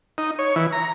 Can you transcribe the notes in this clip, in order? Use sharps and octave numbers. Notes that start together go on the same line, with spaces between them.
D#4
C#5
E3
A#5